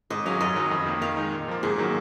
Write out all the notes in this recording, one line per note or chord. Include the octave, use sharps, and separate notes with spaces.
G#2 D#5
F#3 C#4 G#4 F5
F#2 D#5
D#3 F#3
F2
D#3 A#3
D#3 F5
G#3 D#4
A#2
F3 A#3
G#2 G#4
D#3 F#3 A#3